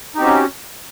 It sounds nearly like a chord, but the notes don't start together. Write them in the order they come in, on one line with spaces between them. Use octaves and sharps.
D#4 G4 C4 F#4 C#4